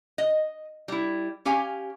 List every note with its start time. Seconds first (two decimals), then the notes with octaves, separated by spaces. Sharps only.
0.18 D#5
0.88 G3 E4
1.45 C#4 G4 F5 G#5